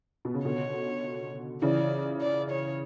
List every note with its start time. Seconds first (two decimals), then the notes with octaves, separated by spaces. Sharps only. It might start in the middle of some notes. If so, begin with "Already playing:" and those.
0.25 B2
0.34 C#3
0.45 B2 D3 C#5
1.62 C#3 E3 D5
2.21 D5
2.51 C#5